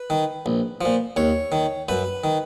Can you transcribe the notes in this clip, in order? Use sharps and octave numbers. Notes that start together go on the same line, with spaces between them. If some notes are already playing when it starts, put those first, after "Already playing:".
Already playing: B4
D#3
A#1
A#2 F3
D#2 C#5
D#3
F#2 B4
D#3